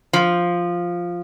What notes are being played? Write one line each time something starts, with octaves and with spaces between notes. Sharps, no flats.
F3